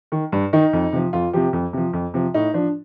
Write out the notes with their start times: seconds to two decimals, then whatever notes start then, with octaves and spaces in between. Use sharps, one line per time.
0.12 D#3
0.32 G2
0.53 D#3 D#4
0.73 F2
0.93 C3 F3
1.13 F2 F4
1.33 C3 F3 G4
1.53 F2
1.73 C3 F3
1.93 F2
2.14 C3 F3
2.34 A2 D#4
2.54 F3 D4